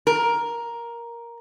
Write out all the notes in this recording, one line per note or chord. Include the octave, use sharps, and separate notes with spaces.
A#4